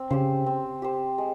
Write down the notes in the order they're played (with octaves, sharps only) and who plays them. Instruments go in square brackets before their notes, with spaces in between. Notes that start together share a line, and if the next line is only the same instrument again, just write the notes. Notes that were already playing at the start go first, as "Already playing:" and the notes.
Already playing: [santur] C4
[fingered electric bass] C#3 [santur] G4 C5
[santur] C4
G4 C5
G#3